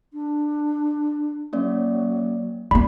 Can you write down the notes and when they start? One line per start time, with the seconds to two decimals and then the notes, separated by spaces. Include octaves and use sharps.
0.13 D4
1.53 F#3 A#3 C#4 D5
2.71 D#2 B3 D5 B5